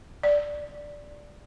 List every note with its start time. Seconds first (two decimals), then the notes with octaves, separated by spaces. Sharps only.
0.23 D5